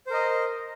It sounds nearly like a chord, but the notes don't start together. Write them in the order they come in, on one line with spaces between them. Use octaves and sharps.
C5 A#4 D#5